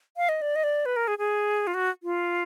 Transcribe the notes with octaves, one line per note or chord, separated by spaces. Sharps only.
F5
D#5
D5
D#5
D5
B4
A#4
G#4
G#4
F4
F#4
F4